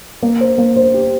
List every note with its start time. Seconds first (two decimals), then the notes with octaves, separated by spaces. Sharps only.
0.23 A#3
0.41 C5
0.58 A#3
0.76 C5
0.94 G4